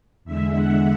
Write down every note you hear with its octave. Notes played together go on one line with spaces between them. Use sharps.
E2 D3 G#3 E5
F#5